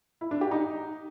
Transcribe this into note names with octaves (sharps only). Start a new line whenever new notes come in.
E4
D4
G4
D#4